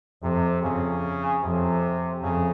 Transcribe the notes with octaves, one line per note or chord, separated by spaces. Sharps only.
F2 C3
F2 C#3
F2 C3
F2 C#3